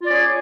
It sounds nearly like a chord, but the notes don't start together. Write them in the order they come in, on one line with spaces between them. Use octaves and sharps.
F4 D5 C#4 G#4